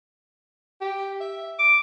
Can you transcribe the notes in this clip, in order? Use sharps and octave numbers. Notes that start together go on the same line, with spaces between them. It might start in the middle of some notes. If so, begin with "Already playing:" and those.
G4
E5
D6